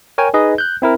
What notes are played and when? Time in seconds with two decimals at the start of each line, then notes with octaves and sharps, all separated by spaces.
0.18 A#4 C#5 G5 G#5
0.34 D#4 G#4 B4 D#5
0.58 F#6 G6
0.82 C4 E4 A#4